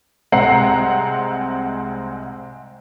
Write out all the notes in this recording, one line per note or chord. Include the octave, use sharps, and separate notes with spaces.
C2 G#3 C4 F#5 A#5 C7